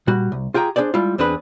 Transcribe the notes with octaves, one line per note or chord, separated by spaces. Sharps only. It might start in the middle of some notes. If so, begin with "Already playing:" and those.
A#2 G3 F#4
C2
F4 G4 G#4 G5 A#5
D4 D#4 G#4 C5 D5
G3 G#3 E4 F4
E2 C4 D4 G#4 B4 B5